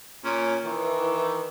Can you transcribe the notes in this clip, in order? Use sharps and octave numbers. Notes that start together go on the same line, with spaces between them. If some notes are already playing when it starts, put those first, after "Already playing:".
A#2 C#4
D#3 E3